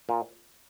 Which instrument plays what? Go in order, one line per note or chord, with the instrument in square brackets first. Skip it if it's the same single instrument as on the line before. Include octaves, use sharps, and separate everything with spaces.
[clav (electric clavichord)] A#2